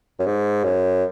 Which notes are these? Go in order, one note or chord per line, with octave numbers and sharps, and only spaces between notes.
F#2
G#2
F#2